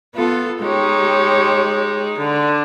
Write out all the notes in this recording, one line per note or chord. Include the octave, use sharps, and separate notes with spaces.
B3 F4 A4
G#3 D#4 G4 C#5
D3